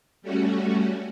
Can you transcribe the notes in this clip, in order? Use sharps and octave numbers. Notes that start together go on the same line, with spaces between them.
G3 A3 C#4 F#4